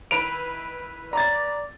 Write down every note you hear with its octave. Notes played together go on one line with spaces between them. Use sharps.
D#3 E4 B4 D7 F7
D5 A#5 A6